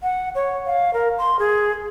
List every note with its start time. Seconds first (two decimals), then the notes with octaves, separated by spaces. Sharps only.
0.03 F#5
0.35 C#5
0.66 F5
0.94 A#4
1.18 C6
1.39 G#4